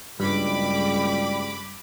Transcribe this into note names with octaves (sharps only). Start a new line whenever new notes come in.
F#1 C#2 G2 G3 B5 D6